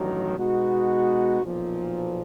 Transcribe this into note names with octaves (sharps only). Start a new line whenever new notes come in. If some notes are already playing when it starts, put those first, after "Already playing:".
Already playing: A1 G2 D#3 F#3
B2 G#3 B3 D#4 F#4
B1 A#2 F3